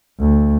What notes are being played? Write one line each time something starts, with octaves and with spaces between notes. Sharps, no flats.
D2